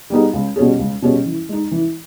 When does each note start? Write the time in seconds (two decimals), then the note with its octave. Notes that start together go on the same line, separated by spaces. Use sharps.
0.10 G3 B3 D#4 G#4
0.33 C#2
0.56 B2 G3 C#4 G#4
0.79 C#2
1.02 B2 G3 C#4 G#4
1.26 E3
1.49 G#3 D#4
1.71 E3